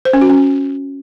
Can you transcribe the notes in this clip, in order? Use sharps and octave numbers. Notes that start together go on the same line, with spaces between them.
C5
C#4
F#4
C#4